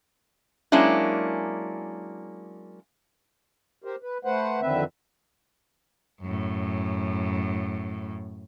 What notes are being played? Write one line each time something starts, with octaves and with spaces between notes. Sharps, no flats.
F#3 G#3 A#3 C#4 D4 E4
G4 A#4 C5
B4
A3 B4 C5 F#5
F2 D3 D#3 C4 B4 E5
F#2 A2